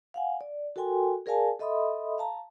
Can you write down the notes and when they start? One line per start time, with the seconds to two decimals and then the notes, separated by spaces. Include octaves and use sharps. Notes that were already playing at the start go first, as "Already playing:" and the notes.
0.14 F5 F#5 G#5
0.41 D5
0.76 F#4 A4 A#4 G5 G#5 C6
1.26 G#4 A#4 D5 F5 G#5 A5
1.60 A4 D#5 E5 B5 C6 D#6
2.18 F5 A5 A#5